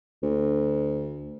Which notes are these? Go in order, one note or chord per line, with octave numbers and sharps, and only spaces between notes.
D2